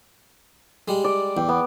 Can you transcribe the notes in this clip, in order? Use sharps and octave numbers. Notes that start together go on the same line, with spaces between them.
G3 G#3
D5
E2 G5
B3